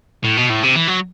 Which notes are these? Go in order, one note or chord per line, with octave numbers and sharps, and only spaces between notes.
A2
B2
A2
C3
E3
F#3